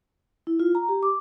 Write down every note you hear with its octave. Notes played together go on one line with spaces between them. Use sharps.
E4
F4
A#5
G4
D6